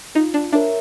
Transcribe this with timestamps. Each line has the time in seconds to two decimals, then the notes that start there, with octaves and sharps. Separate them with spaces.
0.15 D#4 F4
0.34 D4
0.52 D4 A#4 C#5 E5